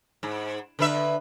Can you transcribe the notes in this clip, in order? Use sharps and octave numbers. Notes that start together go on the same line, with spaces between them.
G#2
D3 B4 E5